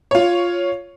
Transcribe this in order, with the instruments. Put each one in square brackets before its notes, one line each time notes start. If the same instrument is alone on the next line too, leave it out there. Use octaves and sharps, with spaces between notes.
[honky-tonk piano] F4 C#5